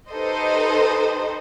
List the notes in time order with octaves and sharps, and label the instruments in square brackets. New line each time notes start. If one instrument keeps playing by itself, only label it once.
[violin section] D#4 G4 A4 B4 C5 D#5